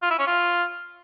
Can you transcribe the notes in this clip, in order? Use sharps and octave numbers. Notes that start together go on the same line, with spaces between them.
F4
E4
C#4
F4